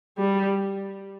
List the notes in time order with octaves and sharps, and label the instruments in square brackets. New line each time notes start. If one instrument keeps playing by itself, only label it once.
[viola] G3